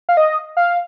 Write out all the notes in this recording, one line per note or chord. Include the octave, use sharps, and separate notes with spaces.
F5
D#5
F5